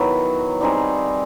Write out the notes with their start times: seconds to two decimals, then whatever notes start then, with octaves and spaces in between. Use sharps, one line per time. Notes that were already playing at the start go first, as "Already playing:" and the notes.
Already playing: D#3 F#3 B3 E4
0.61 G3 C4 D#4 G#4